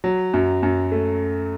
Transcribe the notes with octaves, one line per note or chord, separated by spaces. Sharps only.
F#3
F#2
F#2
A3